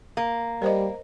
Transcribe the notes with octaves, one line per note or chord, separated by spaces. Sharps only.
A#3
G3 A#4 C5 D#5